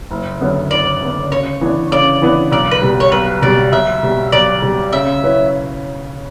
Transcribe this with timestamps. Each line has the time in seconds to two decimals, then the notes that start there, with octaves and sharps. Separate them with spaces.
0.11 F#1
0.41 F#2 D3 F#3 B3
0.71 F#1 D5
1.01 F#2 D3 F#3 B3
1.31 C#3 C#5
1.61 E3 B3 D4
1.91 C#3 D5
2.22 E3 B3 D4
2.52 B1 D5
2.71 B4
2.82 B2 G3
3.00 C#5
3.12 B1 B4
3.42 B2 G3 D5
3.72 B1 E5
4.03 B2 G3
4.32 B1 D5
4.62 B2 G3
4.93 C#3 E5
5.23 F#3 C#4 E4 B4